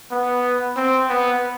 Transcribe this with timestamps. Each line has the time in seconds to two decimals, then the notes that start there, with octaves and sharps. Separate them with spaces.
0.11 B3
0.76 C4
1.09 B3